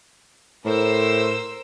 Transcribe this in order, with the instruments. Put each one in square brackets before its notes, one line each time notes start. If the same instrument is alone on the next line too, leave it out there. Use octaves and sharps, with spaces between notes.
[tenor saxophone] A2 [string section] A#4 C5 E6